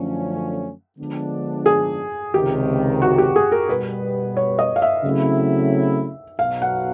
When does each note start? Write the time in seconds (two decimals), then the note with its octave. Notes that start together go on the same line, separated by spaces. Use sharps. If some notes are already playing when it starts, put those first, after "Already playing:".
Already playing: F#2 D3 F3 A3 C#4
0.99 D3 F3 G#3 B3 D4
1.66 G#4
2.34 C#2 C3 D#3 G4
3.02 F#4
3.18 G4
3.36 G#4
3.52 A#4
3.69 B2 G3 B3 B4
4.37 C#5
4.59 D#5
4.76 F5
4.82 E5
5.04 C#3 F#3 A3 C4 E4
6.39 B1 B2 F#3 F5
6.62 F#5